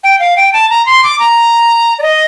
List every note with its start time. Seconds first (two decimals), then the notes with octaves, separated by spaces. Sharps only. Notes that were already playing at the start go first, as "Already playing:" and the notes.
0.04 G5
0.20 F5
0.37 G5
0.53 A5
0.70 A#5
0.86 C6
1.03 D6
1.20 A#5
1.99 D5
2.03 D#5